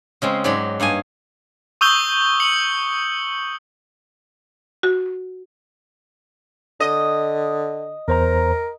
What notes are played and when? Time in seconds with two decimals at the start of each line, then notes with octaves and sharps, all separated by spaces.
0.22 C#3 G#3 C4
0.44 G#2 F#3 G#3 D5 B5
0.80 G2 A#3 D#5 G#5
1.81 C#6 D#6 E6 G6 F7 G7
2.40 C#7 F#7
4.83 F#4
6.80 D3 D#5
8.08 E2 A#4 C5 A#5